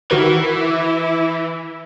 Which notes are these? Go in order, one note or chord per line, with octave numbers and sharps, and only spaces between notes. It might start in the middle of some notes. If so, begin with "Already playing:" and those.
D#3 E3 E4 F#4 A#4